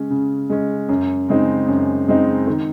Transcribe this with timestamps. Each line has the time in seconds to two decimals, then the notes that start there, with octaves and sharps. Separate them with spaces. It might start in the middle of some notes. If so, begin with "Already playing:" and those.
Already playing: C#3 G#3 C#4
0.10 C#3
0.50 G#3 C#4
0.89 F#2
1.28 C#3 G#3 C4 D#4
1.68 F#2
2.08 C#3 G#3 C4 D#4
2.47 D#3